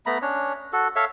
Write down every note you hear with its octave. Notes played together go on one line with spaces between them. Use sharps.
A3 B3 A#5 B5
C#4 D4 C#5
F#4 A4
A4 C#5 E5 F5